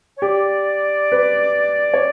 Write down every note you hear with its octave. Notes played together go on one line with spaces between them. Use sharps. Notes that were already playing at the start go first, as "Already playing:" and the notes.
C#5
G4 D5
B4
C#5